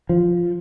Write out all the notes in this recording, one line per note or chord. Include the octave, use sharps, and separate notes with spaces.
F3